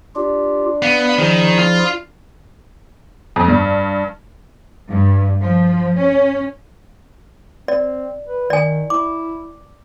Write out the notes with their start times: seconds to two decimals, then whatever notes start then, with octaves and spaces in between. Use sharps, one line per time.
0.16 D4 F4 G4
0.82 B3 F5
1.19 D#3 F3 E4 G#4
1.59 F4
3.36 F2
3.48 G2
4.89 G2
5.41 F3
5.98 C#4
7.68 C4 D5
8.28 B4
8.50 D#3 D5 G#5
8.90 E4 D6